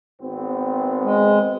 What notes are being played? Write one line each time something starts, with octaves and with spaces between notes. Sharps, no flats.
G#1 B3 C4
G#3